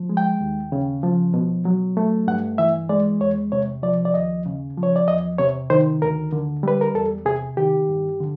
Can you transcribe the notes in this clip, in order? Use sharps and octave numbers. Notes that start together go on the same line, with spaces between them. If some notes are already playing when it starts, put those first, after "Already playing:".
Already playing: F3
G#3
G5
D#2
C#3
F3
B2
F#3
A3
G2 F#5
E3 E5
G#3 D5
E2 C#5
C3 C#5
F3 D5
D5
D#2 D#5
C#3
F3
C#5
D5
E2 D#5
C3 C#5
D#3 C5
D2 A#4
D3
G3 B4
A#4
E2 A4
C3 G#4
D#3 G4
G2
D3